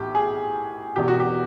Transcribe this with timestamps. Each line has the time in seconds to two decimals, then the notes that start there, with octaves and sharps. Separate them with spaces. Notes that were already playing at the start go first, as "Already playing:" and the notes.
Already playing: B1 A2 E3 G4
0.15 G#4
0.96 E1 E2 B2 G4
1.08 F#4
1.20 G4